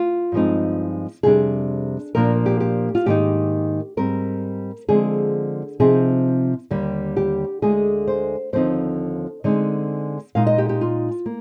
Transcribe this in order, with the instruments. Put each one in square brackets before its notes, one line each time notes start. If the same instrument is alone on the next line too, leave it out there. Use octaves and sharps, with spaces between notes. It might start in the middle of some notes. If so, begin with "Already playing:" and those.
Already playing: [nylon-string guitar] F4
G2 F3 G#3 C4 D#4
F2 C3 G3 D4 G#4
A#2 F3 A#3 D4 A#4
G4
G4
F4
G#2 D#3 A#3 D#4 G4
G#2 G3 C4 A#4
D3 F3 G#3 C4 G#4
C3 F3 C4 D#4 G#4
D#2 D3 G3 A#3
G4
D2 D3 G#3 G#4
C5
D#2 D3 F3 C4 D#4 C5
D3 G#3 C4 D#4
A#2 G#3 D#4 F5
D#5
G4
G4
F4
A#3